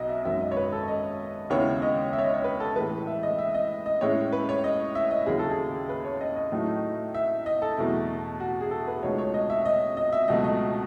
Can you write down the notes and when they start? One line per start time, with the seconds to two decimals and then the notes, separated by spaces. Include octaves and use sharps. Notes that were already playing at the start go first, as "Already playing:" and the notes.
Already playing: B1 B2 D#5
0.09 E5
0.25 G#1 F#2 D#3 F#3 C#4 E5
0.41 D#5
0.52 C#5
0.57 B4
0.72 A4
0.88 D#5
1.50 D#2 C#3 G#3 B3 E4 C#5
1.82 D#5
2.13 E5
2.19 C#5
2.24 D#5
2.34 C#5
2.44 B4
2.60 A4
2.76 A2 E3 G#3 B4
3.07 E5
3.23 D#5
3.39 E5
3.54 D#5
3.86 D#5
4.01 A2 G#3 C#4 E4 C#5
4.33 B4
4.49 C#5
4.64 D#5
4.95 E5
5.11 D#5
5.26 D#2 C#3 F#3 C#4 E4 G#4
5.39 A4
5.51 G#4
5.89 B4
6.05 C#5
6.21 D#5
6.36 D#5
6.52 A2 F#3 A3 D#4
7.14 E5
7.46 D#5
7.62 A4
7.77 E2 B2 F#3 A3 E4
8.40 F#4
8.61 G#4
8.71 A4
8.87 B4
9.03 C#2 B2 A3 D#4 C#5
9.18 C#5
9.34 D#5
9.50 E5
9.65 D#5
9.97 D#5
10.13 E5
10.28 C#2 B2 F#3 A3 D#5
10.44 D#5